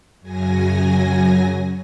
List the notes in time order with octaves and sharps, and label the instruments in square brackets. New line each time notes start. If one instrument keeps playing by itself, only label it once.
[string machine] F#2 C#3 F#3 G#5 A#6